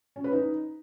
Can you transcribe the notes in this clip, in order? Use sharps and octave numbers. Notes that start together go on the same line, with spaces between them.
C#4
B4
D#4